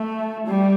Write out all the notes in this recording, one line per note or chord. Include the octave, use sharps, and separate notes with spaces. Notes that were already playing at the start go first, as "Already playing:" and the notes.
Already playing: A3
G3